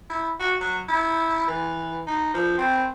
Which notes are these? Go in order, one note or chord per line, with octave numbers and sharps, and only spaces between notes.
E4
F#4
F#3
E4
E3
D#4
F3
C4